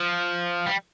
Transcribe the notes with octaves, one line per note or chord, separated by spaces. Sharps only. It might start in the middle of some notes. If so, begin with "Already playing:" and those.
Already playing: F3
G3